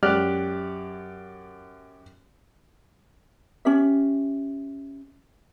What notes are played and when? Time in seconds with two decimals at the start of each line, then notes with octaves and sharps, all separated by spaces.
0.03 F#2 G4 D5 F6 F#6
3.65 C#4 G4 E5